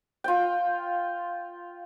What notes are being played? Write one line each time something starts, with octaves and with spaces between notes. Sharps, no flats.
F4 G5